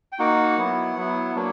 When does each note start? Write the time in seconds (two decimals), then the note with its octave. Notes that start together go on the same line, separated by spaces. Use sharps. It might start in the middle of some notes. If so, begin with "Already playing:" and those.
0.12 G5
0.19 A#3 D#4 F#4 F#5
0.58 F#3 B3 E4
0.96 F#3 B3 E4
1.35 F#3 A#3 D4